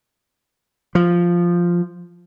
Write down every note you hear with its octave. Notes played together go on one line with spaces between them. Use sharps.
F3